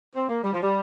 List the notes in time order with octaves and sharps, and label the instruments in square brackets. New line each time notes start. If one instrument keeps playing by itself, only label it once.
[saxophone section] C4
A#3
G3
F3
G3